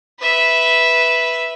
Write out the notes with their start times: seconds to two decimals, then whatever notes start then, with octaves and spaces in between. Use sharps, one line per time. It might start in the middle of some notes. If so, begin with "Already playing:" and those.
0.20 B4 E5